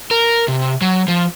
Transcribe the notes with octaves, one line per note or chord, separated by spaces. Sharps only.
A#4
C3
F#3
F3